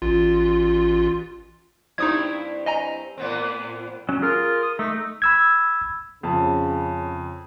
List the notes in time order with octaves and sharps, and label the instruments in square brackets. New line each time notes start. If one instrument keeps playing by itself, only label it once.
[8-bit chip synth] A1 F4
[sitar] G2 C4 E4 [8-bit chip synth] D#4 D#6 G#6
[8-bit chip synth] D#5 G#5 A#5
[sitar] A2 B3 C4
[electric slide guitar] F#3 C#4
[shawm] F4 [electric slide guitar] G#4 A#4
[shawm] D#6
[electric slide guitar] A3 [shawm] D#4
[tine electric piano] B5 E6 G#6
[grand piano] F2 A5 [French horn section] C#3